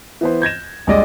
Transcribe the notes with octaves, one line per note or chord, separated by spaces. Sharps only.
E3 B3 C5
G6 G#6 A#6 E7
A#1 G3 G#3 D5 D#5 A#6